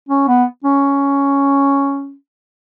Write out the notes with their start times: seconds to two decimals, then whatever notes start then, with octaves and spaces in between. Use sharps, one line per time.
0.09 C#4
0.28 B3
0.64 C#4